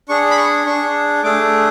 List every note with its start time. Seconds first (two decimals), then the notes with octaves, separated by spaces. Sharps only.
0.09 D4 G#4 C#6
0.31 B5
0.37 C#6
0.66 D4 G#4 C#6
1.23 A3 D4 G#4 D6